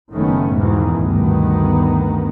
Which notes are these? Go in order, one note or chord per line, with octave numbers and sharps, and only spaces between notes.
F#1 D#3 A3 B3 C#4
E2 G#2 B2 D#3 E3
D2 G2 D#3 B3